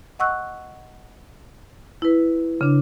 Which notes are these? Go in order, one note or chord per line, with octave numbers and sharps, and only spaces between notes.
D#5 F#5 C#6 E6 F#6
E4 B4
C#3 D4